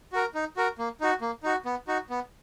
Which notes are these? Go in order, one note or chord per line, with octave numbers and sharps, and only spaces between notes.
F#4 A#4
D#4
F#4 A#4
A#3
D#4 F#4
A#3
D#4 F#4
B3
D#4 F#4
B3